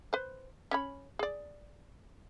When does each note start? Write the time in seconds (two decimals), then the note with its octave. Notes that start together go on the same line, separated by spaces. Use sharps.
0.13 B4 C5
0.71 C#4 C#5 B5
1.19 G#4 D5